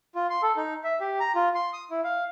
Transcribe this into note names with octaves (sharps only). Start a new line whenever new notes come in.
F4
C6
A4
D#4
E5
G4
A#5
F4
C6
D#6
E4
F5